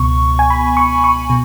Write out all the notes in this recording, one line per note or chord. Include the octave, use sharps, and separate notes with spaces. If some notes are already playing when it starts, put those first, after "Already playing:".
Already playing: C#2 B2 B3 C#6
G#5
B5
C#6
C#6
B2